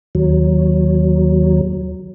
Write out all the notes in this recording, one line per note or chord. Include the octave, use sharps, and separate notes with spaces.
D#2 F#3